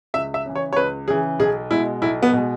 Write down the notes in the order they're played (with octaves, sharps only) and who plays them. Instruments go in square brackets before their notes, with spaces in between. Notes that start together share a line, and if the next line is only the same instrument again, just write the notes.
[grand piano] C#2 [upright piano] E5
[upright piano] E5
[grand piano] C#3 E3
[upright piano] C#5
C#5
[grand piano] C#2 [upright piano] B4
[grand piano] C#3 E3 [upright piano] G#4
[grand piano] B1 [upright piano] G#4
[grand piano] B2 G#3 [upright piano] E4
[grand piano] B1 [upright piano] E4
[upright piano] B3
[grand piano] B2 G#3